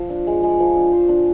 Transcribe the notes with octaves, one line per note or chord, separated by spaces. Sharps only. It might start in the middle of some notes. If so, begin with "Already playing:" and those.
Already playing: F3
D4
G#3
G#3
F3
D4
C5
D4